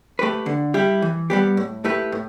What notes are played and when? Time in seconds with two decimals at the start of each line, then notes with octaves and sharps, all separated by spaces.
0.19 A3 G4 B4
0.46 D3
0.74 G3 E4 G4
1.02 E3
1.30 G3 B3 G4
1.57 A2
1.85 A3 E4 G4 B4
2.12 A2